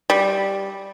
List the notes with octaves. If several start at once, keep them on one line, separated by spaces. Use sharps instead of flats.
G3